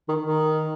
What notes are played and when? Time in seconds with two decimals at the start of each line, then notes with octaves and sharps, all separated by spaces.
0.09 D#3
0.24 D#3